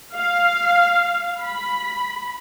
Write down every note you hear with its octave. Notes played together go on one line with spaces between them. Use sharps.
F5
B5